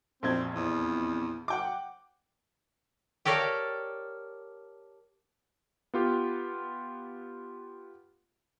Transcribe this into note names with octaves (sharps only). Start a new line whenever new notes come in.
A#1 F2 C4 G#6
E2
F#5 G5 D6
G4 A4 A#4 C#5 D5 F5
B3 F4 G4